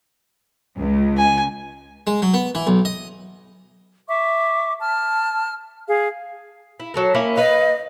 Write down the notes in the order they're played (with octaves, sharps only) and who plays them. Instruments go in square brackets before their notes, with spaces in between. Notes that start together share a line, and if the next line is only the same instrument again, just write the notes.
[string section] C#2
[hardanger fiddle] G#5
[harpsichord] G#3
F#3
B3
E3
B1
D#5
[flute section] E5 C#6 D6
A5 F6
G#4 F5
[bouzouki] E4
F#3 A4 A#4
A#3 C#4 E4
[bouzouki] B4 F5 [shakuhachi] D#5